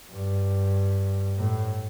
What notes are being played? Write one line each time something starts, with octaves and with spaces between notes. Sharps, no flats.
G2
A2